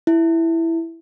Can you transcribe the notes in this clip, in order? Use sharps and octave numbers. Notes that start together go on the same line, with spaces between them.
E4